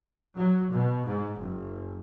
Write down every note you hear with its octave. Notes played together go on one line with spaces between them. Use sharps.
F#3
B2
G#2
F#1